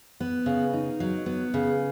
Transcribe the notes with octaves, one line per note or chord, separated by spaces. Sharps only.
B3
C#3
D#4
F#3
B3
C#3